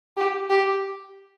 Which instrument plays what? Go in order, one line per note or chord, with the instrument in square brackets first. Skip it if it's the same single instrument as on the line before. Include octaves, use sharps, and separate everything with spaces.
[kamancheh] G4
G4